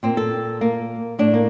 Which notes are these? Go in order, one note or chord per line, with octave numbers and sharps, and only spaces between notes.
A#2 C4
A4
A#3
A2 D4
A#3